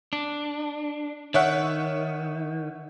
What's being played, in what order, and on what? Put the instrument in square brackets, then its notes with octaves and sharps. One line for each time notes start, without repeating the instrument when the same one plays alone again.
[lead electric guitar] D4
[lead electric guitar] D#3 [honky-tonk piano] C#5 E5 F#5